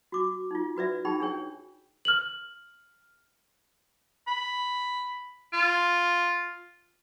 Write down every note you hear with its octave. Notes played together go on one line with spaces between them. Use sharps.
F#4 D6
D#4 F4
F#4 B4 D5 E5
D#4 G#4 G5 B5
D4 G#4 C#5 G5
F6 F#7
B5
F4